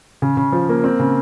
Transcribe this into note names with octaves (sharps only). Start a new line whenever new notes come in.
C#3
C#3
F3
A#3
C4
C#3